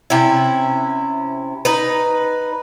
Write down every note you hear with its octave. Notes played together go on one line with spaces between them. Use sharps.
C3 C#4 E4
D#4 B4